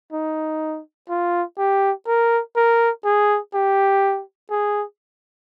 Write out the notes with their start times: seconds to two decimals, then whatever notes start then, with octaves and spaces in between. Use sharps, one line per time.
0.12 D#4
1.09 F4
1.58 G4
2.07 A#4
2.56 A#4
3.05 G#4
3.54 G4
4.50 G#4